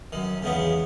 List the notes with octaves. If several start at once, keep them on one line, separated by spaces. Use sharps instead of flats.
F#2 D#3
E2 C#3 G#3 B3